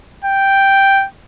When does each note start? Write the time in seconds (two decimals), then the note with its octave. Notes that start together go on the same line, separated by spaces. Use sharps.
0.24 G5